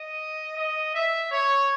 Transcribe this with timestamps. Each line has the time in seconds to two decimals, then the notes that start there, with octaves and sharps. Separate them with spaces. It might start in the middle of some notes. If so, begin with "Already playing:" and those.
Already playing: D#5
0.57 D#5
0.94 E5
1.31 C#5